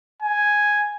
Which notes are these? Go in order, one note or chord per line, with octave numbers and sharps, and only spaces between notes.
G#5